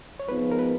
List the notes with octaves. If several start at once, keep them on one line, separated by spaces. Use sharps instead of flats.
C#5
G#2 F3 G#3 B3 B4
A#4
B4